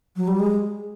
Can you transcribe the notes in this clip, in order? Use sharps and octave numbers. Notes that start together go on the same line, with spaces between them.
F#3
G3
G#3